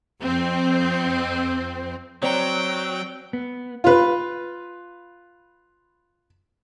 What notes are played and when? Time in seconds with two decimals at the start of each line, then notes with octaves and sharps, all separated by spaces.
0.21 F2 C4
2.23 F#3 C4 C#5 D5 G5 A#5
3.33 B3
3.84 F4 B4